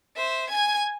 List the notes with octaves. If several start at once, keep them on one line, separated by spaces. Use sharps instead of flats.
C5 E5
G#5 G#6